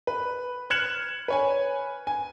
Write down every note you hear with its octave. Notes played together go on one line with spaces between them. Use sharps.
B4
F6 F#6 G#6 C#7 E7 F#7
B4 C#5 G#5
G#5